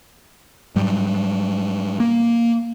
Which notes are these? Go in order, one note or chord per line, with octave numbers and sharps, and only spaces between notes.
G#2 F#3 G3
A#3